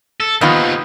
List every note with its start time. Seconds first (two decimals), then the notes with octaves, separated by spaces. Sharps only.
0.20 A4
0.41 D#2 D#3 F3 B3 F4